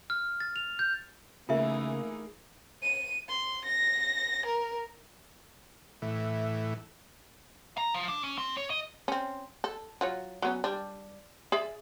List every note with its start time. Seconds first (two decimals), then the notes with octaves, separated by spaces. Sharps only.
0.10 F6
0.40 A6
0.56 F7
0.79 G6
1.49 C#3 E3 A3 A#3 D#4 F4 G#4 E5
2.83 D#7
3.28 C6
3.65 A#6
4.46 A#4
6.02 A2 E3
7.78 A#5
7.94 F3
8.08 D4
8.24 C#4
8.38 C4
8.57 C#5
8.70 D#5
9.08 C4 C#4
9.64 A4
10.01 F#3 F4 C#5
10.42 F#3 B3 C#4
10.64 G3 D4
11.52 G#4 D5 E5